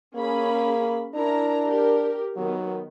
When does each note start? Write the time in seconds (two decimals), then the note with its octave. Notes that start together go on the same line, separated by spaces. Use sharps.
0.16 A#3 C#4 G#4 B5
1.15 D4 E4 A#4 A#5
1.67 G4 A#4
2.37 D#3 F#3 B3